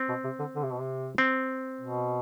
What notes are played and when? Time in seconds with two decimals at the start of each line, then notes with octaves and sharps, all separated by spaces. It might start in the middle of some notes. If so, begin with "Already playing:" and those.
Already playing: C4
0.09 B2
0.24 C3
0.39 D3
0.55 D3
0.64 C3
0.71 B2
0.80 C3
1.18 C4
1.81 B2